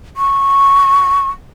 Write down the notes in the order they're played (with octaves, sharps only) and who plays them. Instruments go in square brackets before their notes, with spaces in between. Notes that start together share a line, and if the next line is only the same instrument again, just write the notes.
[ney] C#6